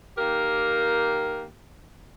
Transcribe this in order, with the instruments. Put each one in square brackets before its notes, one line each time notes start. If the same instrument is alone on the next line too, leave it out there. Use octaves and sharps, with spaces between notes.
[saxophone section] D#3 A#3 G4 A#4